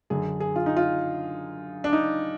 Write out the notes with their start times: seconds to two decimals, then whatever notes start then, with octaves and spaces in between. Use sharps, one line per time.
0.10 F#2 D3 G#4
0.40 G#4
0.56 F4
0.66 D#4
0.76 F4
1.84 D4
1.93 D#4